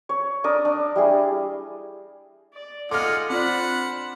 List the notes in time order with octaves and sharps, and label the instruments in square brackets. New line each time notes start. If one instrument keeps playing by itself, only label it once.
[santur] C#5
D4 A#4 D#6
D4
G3 E4 G#4
[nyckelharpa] D5
[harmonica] G#3 D#4 F4 [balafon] A4 [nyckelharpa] F#5 [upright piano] D6 F6
[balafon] C4 F4 D5 [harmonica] D4 F#5 [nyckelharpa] C5 B5